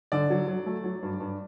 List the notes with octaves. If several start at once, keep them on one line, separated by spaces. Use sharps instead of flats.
D3 D5
F#3
F#3
A3
F#3
G2
G2